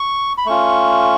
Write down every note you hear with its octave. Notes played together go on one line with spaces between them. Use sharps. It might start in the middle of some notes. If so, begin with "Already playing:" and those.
Already playing: C#6
B5
A3 C#4 F4 C#6